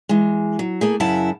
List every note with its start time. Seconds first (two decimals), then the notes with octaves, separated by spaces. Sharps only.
0.09 E3 G#3
0.59 F#3
0.81 A3 A#3 G#4
1.00 F#2 C#3 E4 F#5 A5